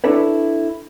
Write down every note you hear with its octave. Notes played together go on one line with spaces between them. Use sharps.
D4 E4 A4 B4 C#5